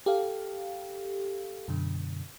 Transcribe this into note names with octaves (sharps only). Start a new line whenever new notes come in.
G4 A4 F5
F#2 B2 D3